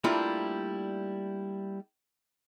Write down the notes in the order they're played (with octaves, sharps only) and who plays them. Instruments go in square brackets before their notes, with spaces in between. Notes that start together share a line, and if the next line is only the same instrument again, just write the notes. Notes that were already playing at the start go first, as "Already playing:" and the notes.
[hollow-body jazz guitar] G3 A3 A#3 D4 E4 F4